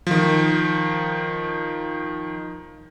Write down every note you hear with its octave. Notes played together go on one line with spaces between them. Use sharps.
D#3 F3